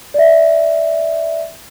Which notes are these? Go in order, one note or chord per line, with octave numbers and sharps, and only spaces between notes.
D5 E5